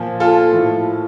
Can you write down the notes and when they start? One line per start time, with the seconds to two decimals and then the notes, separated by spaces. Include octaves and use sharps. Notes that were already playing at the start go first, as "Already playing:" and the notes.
Already playing: A#2 F3
0.20 F4 A4
0.52 A2 F3